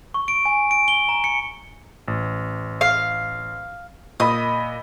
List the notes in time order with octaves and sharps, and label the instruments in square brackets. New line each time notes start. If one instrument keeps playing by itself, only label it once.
[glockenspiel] C#6
D7
G#5
D7
G7
A#5
C#7
[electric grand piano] A1
[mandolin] F5
[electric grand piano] A#2 D#5 B5 [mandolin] D#6